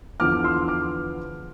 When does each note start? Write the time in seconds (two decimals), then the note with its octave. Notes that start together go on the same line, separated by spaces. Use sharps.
0.20 E2 D3 F3 B3 D6 F6
0.44 C6 E6
0.68 D6 F6